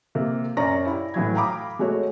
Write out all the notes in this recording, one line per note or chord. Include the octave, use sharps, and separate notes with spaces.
C3 A#3
F#2 C#4 D5 A#5 C#6 A#6
E4 G4
A2 E3 F#3 G#6
F5 G5 A#5 B5 D6 D#6
G#3 A3 F#4 C#5